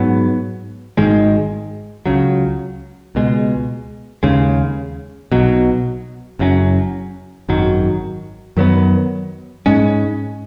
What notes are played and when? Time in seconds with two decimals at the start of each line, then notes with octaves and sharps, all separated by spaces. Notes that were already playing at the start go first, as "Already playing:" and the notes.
Already playing: G#2 F#3 B3
0.97 G#1 G#2 D#3 G#3
2.06 C#2 C#3 F#3
3.15 C#2 B2 G#3
4.23 D#2 C#3 G#3
5.32 B1 B2 F#3
6.39 F#1 F#2 F#3 C#4
7.49 G#1 F#2 D#3 F#3
8.57 F#2 D#3 F#3 B3
9.66 G#2 G#3 C#4